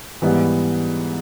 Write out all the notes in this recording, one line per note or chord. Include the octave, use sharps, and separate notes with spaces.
G#2 E3 G3 B3